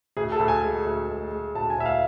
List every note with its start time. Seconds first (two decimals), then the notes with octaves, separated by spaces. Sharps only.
0.17 D2 G#4
0.32 A4
0.39 D2
0.48 G#5
0.63 G#3
0.86 D2
1.09 G#3
1.31 G#3
1.55 D2 A5
1.70 G#5
1.78 D2 E5
1.86 F5